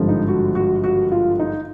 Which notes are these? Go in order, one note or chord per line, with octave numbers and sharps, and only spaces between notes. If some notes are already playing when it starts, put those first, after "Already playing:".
Already playing: G#1 G2 D3 F3
D#4
F#4
F#4
F#4
F4
D#4